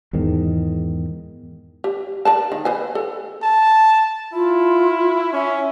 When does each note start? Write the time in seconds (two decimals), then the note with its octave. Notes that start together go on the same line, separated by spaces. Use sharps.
0.13 E2 G#2 D#3
1.84 G4
2.25 A#4 D5 A5
2.52 D#3
2.65 B4 C5 G#5
2.95 A4
3.42 A5
4.33 E4 F4
5.33 C#4 E5